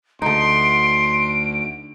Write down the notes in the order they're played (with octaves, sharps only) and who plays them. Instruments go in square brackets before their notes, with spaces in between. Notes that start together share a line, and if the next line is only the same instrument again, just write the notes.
[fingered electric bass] D2 [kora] D3 D#4 [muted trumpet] C6 [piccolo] D7